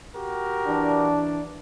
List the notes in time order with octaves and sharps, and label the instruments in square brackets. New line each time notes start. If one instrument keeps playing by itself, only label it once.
[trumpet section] F#4 G4 A#4
[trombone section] E3 D4